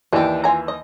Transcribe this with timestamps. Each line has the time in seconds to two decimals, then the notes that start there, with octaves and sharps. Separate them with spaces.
0.13 D#2 E3 D4 G4
0.44 F4 G#5 A#5
0.68 D#5